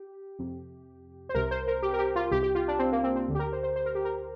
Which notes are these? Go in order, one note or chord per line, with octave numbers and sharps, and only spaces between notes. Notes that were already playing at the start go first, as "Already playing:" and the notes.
Already playing: G4
F2 C3
C5
C2 C3 A#4
C5
A#4
G4
A#4
G4
F4
C2 C3 G4
G4
F4
D4
C4
A#3
C4
C4
D2 D3
G4
A#4
C5
C5
C5
A#4
G4
A#4